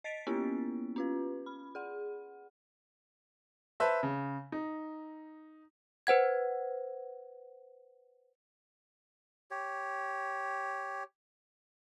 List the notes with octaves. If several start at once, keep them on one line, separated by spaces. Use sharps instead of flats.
D#5 A6 B6 D7
A#3 B3 C#4 E4 G4
C#4 F4 B4
B5
G#4 F#5
B4 C5 E5 A5
C#3
D#4
B4 C5 F#5 G#6
G4 C#5